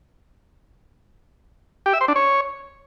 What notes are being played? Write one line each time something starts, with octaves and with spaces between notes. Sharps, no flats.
G4
E5
C5
D4
C#5